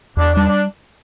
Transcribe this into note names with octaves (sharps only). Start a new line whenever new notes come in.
E2 D4
G3 D4
D4